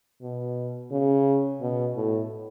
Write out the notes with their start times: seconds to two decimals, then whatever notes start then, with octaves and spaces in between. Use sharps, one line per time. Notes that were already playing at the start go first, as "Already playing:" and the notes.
0.22 B2
0.91 C#3
1.61 B2
1.96 A2